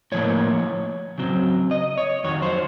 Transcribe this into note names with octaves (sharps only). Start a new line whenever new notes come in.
A2 F3 A#3 C#5
C#3 F#3 C4
D#5
C#5
F2 D#3 F#3 C#5
C5